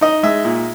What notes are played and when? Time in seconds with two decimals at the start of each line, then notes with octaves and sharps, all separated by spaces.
0.01 D#4 D#5
0.23 G#3 E5
0.45 A#2